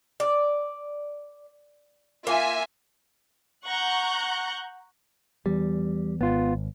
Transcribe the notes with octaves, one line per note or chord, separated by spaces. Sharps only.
D5
A#3 F4 E5 G#5
F#5 A#5 C#6 F#6 G6
E2 G3
G#1 B3 F4